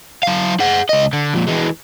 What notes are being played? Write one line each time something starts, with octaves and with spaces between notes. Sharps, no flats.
F#3 F5
G#4 F#5
C#2 D#5
D3
F2 A#2
E3 G#3